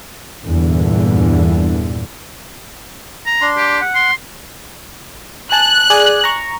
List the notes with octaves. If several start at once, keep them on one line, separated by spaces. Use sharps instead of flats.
E2 G2 A#2 D3 E3
A#5
D4 C6
G4
F#5
C6
G#5 A5 F#6
G#4 D5 G#5
A#5 C#6